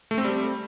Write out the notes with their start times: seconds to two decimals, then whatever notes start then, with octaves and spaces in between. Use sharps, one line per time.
0.11 A3
0.18 C4
0.25 G3